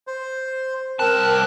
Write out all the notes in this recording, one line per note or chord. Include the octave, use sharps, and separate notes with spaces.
C5
C2 C4 A#4 A5 F#6